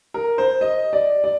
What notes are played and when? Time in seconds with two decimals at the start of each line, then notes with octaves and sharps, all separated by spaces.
0.14 A#4
0.38 C5
0.61 D#5
0.93 D5
1.24 D5